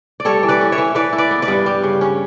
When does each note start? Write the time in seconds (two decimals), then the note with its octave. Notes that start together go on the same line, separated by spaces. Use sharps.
0.20 D5
0.25 G3 A4 C#5
0.43 E3
0.48 B4 D5
0.61 C#4
0.72 C#5 E5
0.78 E3
0.95 E3 B4 D5
1.13 E4
1.18 B4 D5
1.31 B3
1.42 B4 D5
1.48 G2
1.66 G3
1.83 C#3
2.01 C#4